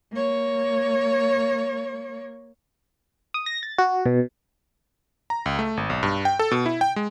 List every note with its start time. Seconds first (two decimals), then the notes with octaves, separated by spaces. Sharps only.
0.13 A#3 C#5
3.34 D#6
3.46 A#6
3.63 A6
3.78 F#4
4.06 B2
5.30 A#5
5.46 C#2
5.59 A3
5.77 G#1
5.90 B1
6.03 G2
6.25 G5
6.39 A4
6.51 B2
6.66 E4
6.81 G5
6.96 G#3